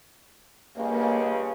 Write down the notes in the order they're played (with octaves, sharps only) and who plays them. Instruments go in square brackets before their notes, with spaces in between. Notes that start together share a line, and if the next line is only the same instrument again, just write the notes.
[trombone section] C#2 G2 C#3 [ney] A#3